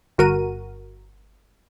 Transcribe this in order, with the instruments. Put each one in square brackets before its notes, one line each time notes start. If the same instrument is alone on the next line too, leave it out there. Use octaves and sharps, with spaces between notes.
[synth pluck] G1 F#4 A#4 D#7